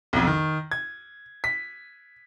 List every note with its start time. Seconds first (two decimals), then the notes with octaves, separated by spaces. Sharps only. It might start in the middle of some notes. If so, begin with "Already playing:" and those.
0.13 B1 F2
0.27 D#3
0.71 G#6
1.44 B6